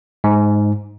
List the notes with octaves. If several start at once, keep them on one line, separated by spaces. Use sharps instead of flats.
G#2